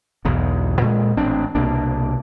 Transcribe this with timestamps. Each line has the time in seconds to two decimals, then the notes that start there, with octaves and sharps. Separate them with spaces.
0.25 B1 E2 G#2 B2
0.81 A#2 G#3
1.17 A1 C4 D4
1.55 C2 B2 A#3 D4